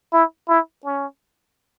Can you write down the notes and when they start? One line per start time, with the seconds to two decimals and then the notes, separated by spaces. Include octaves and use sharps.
0.13 E4
0.49 E4
0.85 C#4